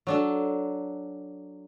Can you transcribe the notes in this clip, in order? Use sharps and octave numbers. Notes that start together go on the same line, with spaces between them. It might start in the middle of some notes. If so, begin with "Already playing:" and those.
F#3 D4 A4